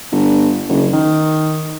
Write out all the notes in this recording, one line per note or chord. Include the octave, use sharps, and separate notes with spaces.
G1
F#1
D#3